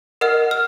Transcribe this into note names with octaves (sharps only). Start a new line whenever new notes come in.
A#4 D#5 F#5 F6
F6